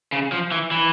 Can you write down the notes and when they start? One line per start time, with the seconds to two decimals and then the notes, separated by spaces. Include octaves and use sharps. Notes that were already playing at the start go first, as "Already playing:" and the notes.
0.12 C#3
0.32 F3
0.52 E3
0.71 E3